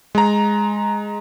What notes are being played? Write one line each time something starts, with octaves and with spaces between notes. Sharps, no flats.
G#3 A#5